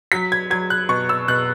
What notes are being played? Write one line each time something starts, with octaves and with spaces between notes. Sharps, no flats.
F#3 B6
G#6
F#3 G#6
F#6
B2 C#6
E6
B2 F#6